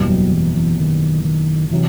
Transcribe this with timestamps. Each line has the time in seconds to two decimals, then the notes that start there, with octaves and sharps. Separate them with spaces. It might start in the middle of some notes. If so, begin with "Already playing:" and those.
Already playing: F#1 E2 B2 G3
0.10 F#3
0.33 E3
0.55 E3
0.80 D#3
1.25 D#3
1.71 C3 E3 F#3